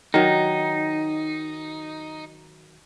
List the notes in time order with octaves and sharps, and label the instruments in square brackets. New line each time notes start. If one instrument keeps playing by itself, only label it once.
[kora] D#3 F#3 [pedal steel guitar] D#4